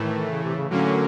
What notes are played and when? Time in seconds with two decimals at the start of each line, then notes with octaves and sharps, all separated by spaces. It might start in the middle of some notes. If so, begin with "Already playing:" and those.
Already playing: A2 D#3 E3 A3
0.30 C#3
0.43 C3
0.55 C#3
0.69 A2 D3 F#3 A#3 C#4